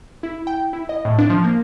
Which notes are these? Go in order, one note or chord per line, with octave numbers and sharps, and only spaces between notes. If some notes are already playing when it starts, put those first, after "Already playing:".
E4
G5
E4
D#5
A2
D4
F3
A#3